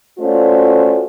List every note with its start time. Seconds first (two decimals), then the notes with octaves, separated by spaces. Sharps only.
0.19 A3 C#4 F4 F#4 C5 D5